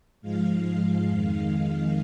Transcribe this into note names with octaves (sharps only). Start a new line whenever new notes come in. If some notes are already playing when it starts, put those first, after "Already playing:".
G#2 F3 G#3 F5
F5
F2 D#3 G#3
F5